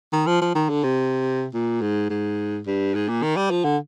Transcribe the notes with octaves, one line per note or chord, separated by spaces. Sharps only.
D#3
F3
F3
D#3
D3
C3
A#2
G#2
G#2
G2
G#2
A#2
D#3
G3
F3
D3